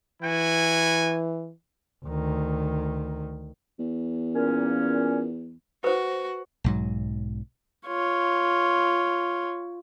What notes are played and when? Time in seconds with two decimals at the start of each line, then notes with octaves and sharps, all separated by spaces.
0.23 E3 E4 F#4 G#5
2.05 D2 D#3
3.79 E2
4.34 A#2 C#4
5.84 F#4 B4 C5
6.64 B1 G#2 F#3
7.86 F4 C#5